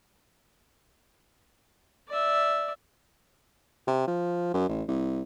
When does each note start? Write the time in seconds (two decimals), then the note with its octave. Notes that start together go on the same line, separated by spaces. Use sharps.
2.09 D5 E5
3.87 C3
4.07 F3
4.54 F#2
4.69 A1
4.88 C2